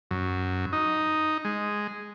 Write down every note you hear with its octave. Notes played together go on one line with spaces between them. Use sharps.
F#2
D#4
G#3